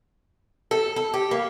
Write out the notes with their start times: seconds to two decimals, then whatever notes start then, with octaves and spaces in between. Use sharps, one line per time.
0.71 A4
0.96 A4
1.14 G4
1.31 A#3